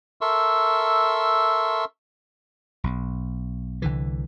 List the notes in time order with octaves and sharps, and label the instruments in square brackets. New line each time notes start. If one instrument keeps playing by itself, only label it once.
[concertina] A4 A#4 E5 C6 C#6 E6
[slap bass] B1
C2 D3 E3